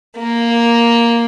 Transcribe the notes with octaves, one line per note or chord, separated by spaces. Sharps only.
A#3